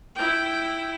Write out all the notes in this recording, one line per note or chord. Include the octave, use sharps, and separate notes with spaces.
E4 G5